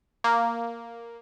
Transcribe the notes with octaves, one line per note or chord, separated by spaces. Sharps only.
A#3